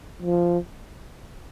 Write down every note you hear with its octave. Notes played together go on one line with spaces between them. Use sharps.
F3